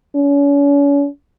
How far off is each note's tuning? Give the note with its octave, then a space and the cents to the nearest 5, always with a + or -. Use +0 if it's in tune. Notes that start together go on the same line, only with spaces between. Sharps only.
C#4 +40